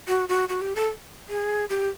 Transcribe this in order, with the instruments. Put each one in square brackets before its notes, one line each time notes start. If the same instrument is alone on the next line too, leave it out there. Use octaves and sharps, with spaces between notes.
[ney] F#4
F#4
F#4
G4
A4
G#4
G4